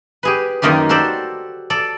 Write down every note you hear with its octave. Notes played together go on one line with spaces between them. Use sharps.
G4 G#4 B4
F#2 D#3 A#3 D#4 F4 G4
F#4 G4 A4 C5 D5
A4 D5